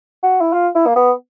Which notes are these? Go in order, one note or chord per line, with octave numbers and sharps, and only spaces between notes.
F#4
E4
F4
E4
A#3
B3